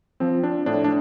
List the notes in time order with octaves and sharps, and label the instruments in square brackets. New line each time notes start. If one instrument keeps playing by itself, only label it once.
[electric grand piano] F3 C4
D4
A2 D4
D4